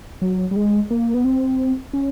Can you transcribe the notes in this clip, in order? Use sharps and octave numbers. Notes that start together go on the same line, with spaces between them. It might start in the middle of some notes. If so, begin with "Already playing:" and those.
F#3
G3
G#3
A#3
B3
C4
C#4